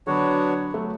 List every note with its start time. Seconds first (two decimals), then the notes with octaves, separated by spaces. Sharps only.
0.07 D3 F#3 B3 D4 F#4 C#5
0.74 F#3 A3